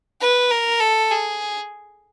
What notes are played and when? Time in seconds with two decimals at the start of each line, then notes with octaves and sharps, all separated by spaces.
0.21 B4
0.51 A#4
0.80 A4
1.11 G#4